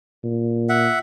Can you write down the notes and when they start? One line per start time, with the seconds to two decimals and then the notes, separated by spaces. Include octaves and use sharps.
0.24 A#2
0.69 E5 F#5